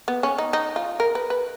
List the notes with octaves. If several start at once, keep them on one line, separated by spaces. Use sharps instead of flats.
B3
C#4
D#4
D#4
F4
A#4
B4
B4